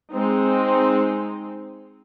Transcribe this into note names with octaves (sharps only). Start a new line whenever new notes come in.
G#3 C4 D#4